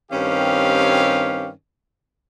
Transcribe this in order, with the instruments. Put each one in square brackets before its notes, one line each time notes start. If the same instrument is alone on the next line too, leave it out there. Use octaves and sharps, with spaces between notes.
[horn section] G2 D#3 C4 C#4 G4 F5